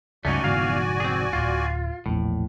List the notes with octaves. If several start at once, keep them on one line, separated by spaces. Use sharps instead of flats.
C#2 G2 A3 C#4 D#4 F#4 D5 G#5
F1 E2 G#2 D3 F5
C4 G#4
D1 F4
E1 A#1 A2